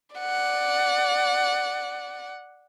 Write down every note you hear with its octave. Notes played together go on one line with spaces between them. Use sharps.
D5 F#5